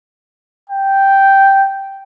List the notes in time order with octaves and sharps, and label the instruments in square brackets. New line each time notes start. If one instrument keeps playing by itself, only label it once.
[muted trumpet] G5